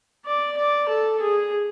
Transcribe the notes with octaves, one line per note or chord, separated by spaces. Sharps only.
D5
D5
A4
G#4